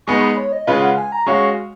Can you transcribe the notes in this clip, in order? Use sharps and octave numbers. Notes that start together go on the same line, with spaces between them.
G#3 B3 D#4 C#6
B5
C#5
D#5
C#3 G#3 C#4 F4 B4 F5
F#5
G#5
A#5
G#3 C#4 F#4 C#5 F5 C#6